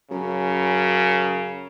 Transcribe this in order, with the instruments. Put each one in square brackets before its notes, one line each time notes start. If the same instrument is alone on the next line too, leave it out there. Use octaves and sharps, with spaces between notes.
[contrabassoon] F#2 [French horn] C#3